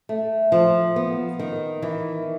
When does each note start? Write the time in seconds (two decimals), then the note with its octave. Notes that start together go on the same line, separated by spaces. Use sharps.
0.09 A3
0.52 F3
0.96 B3
1.39 D#3
1.82 E3